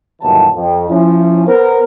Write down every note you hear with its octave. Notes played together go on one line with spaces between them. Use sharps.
G1 D#2 B2 E3 F#3 A5
F2
F3 C#4 E4
B3 A#4 C5